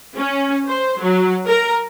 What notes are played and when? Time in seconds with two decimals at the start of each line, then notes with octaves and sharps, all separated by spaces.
0.17 C#4
0.68 C5
1.03 F#3
1.48 A#4